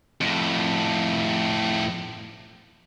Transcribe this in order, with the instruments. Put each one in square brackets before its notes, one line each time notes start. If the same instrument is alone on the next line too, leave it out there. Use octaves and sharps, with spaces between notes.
[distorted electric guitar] F2 A2